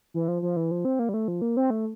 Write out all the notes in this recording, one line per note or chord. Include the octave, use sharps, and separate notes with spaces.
E3
F3
F3
E3
F3
C4
A#3
G3
A3
F3
A#3
C4
A3